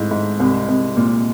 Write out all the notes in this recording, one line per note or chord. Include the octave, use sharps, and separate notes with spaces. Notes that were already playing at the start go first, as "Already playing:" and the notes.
Already playing: G#2 A3 E4
G#2
C2
C2
A#2